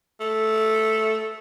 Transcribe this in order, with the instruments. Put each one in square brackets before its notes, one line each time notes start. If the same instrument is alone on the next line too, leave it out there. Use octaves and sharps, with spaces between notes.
[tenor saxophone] A3